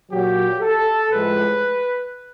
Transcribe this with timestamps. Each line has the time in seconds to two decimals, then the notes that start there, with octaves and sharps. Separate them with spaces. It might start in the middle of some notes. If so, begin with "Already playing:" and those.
0.11 A#2 F#3 G4
0.61 A4
1.10 A2 F3 G#3 B4